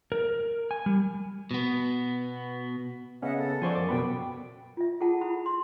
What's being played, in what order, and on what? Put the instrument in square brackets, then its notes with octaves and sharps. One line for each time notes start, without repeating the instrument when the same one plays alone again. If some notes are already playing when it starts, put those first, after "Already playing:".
[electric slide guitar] A#4
G#5
G3
[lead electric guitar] B2 B3
[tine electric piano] C#3 B3 C#4 [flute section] D#5 E5 F#5
[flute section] A4 F#5
[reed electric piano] F3 C5 D5 [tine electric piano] G#5 C6 C#6
[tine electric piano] F#2 D6
[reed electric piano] B2 B3 B5 [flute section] G5
[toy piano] F4 E5
F4 G#4 A4 F#5 A5
E4 A4 F#5 B5
C6